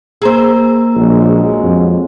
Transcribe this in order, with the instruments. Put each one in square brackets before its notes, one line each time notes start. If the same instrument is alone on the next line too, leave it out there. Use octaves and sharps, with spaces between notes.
[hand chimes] A#3 A#5 E6 [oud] G#4 C5
[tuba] A#1 [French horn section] F#3 G#3
[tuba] F2